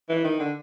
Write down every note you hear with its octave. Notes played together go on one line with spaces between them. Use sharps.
E3
D#3
D3